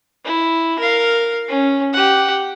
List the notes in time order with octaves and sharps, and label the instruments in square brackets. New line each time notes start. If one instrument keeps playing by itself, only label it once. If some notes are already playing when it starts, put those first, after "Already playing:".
[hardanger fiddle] E4
A#4 F5
C#4
G4 F#5